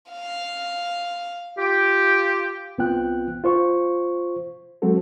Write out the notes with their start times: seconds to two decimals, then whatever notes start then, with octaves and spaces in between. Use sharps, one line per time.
0.11 F5
1.58 F4 G4
2.78 C2 B3 C4 F4 G5 F#6
3.44 F4 C5 C#6
4.82 F#3 G#3 C4 F#4 A4